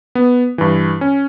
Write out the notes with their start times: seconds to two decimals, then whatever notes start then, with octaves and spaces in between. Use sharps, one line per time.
0.15 B3
0.58 G2 E3
1.01 C#4